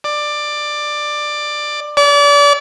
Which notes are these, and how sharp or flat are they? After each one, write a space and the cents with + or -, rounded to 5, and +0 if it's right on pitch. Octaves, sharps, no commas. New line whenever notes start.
D5 +15
D5 -35